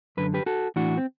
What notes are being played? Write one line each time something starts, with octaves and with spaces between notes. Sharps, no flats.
F#2 D3 B4
G4 B4
F#4 A4
A2 E3 D4 F#4
C4